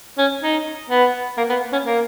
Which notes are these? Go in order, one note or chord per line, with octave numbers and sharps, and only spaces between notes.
C#4
D#4
B3
A#3
B3
C#4
A#3